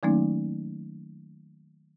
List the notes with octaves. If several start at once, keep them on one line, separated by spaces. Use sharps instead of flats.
D#3 F#3 A3 A#3 C#4 D#4